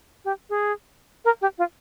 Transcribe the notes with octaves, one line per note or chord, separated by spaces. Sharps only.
G4
G#4
A#4
G4
F4